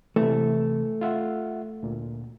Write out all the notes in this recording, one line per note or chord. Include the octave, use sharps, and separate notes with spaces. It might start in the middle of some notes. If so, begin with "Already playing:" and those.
C3 E3 A3
F4 E5 F#5
D2 A#2